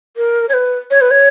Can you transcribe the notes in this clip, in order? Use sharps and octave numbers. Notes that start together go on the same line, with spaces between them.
A#4
C#5
B4
C#5
B4
C#5